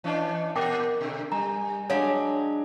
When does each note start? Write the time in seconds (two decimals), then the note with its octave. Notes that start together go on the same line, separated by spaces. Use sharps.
0.04 E3 C#4 D4 D#5 A5
0.56 A#2 G4 A#4 G5 D6
1.01 B2 D3
1.32 G3 G#5 A#5
1.90 F#3 G#3 D4 C#5 F5